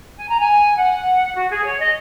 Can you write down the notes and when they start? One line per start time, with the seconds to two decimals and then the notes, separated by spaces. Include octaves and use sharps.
0.17 G#5
0.29 A#5
0.40 G#5
0.76 F#5
1.35 F#4
1.49 G#4
1.64 C#5
1.79 D#5